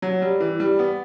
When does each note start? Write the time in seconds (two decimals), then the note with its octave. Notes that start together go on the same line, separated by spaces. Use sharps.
0.02 F#3
0.22 G3
0.40 E3
0.60 G3
0.79 B3